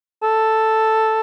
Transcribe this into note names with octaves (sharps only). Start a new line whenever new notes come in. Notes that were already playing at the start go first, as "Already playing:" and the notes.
A4